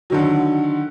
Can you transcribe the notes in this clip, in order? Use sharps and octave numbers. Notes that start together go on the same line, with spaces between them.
D3 D#3 F#3